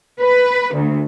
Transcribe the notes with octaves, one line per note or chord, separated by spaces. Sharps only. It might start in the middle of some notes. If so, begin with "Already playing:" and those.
B4
D2